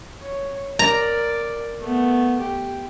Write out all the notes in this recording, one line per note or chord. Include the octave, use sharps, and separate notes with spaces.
C#5
A#4 D5 A#5
A3 B3
G4